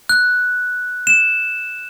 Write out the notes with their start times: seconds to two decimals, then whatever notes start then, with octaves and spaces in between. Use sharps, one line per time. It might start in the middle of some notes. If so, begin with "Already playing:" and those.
0.09 F#6
1.07 E7